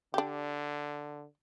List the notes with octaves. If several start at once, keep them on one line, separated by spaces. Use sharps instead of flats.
D3 D4 G4